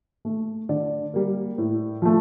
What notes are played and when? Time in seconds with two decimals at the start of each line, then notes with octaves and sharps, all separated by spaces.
0.25 A3
0.69 D3 D5
1.14 G3 A#3
1.58 A2
2.02 F3 A3